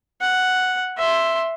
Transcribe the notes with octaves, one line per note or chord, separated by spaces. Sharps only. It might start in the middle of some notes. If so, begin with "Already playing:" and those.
F#5
E5 C6